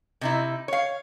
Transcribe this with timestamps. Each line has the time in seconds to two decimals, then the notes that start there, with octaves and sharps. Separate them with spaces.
0.21 C3 D#4 E4
0.68 C#5 F5